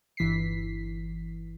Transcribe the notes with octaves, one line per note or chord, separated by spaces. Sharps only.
G1 E3 B6 C7